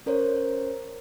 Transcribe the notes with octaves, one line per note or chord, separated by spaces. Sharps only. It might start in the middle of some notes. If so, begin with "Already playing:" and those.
C#4 A#4 C5 C#5